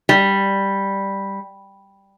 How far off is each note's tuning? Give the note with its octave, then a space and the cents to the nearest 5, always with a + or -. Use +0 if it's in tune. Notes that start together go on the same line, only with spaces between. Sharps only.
G3 +5